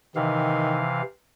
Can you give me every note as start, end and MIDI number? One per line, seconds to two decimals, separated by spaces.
0.16 1.02 48
0.16 0.89 51
0.16 1.02 52
0.16 1.02 77